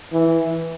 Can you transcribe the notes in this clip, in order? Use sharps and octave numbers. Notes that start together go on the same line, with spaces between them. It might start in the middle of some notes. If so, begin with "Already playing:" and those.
E3